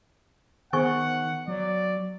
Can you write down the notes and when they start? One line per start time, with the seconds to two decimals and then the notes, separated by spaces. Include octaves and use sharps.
0.73 D#3 B3 G#4 C5 F#5 G#5 C#6
1.48 F#3 D5